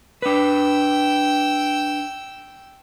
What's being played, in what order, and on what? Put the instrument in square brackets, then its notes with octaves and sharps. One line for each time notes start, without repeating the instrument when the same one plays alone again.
[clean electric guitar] D4 B4 [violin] G5 E6